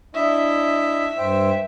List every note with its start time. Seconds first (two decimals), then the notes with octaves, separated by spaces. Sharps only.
0.15 D4 E4 D#5 E5
1.18 G2 C5 G5